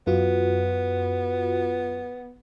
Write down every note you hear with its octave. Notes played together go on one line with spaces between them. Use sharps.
F#2 B3 F4 F#4